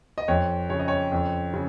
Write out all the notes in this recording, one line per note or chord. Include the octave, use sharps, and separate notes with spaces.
D#5
F2 C#5
C#3 C#5
D#5
C#5
F2
C#3